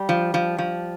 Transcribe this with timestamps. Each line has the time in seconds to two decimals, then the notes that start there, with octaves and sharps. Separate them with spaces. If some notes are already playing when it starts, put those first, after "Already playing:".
Already playing: G3
0.09 F3
0.34 F3
0.58 F3